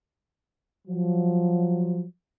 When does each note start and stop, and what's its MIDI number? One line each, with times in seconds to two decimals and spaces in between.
0.88 2.03 53
0.88 2.03 54